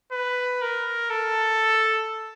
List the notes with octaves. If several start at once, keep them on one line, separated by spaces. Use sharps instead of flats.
B4
A#4
A4